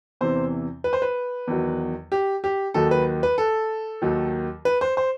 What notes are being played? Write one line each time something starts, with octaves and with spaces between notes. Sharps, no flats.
E2 C3 E3 C5
B4
C5
B4
E2 D#3 F#3
G4
G4
D#2 D#3 F#3 A4
B4
B4
A4
D#2 D#3 F#3
B4
C5
C5